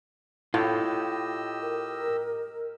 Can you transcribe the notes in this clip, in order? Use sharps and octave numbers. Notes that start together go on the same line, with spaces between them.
A2 F4 G4 D#5 E6
A#4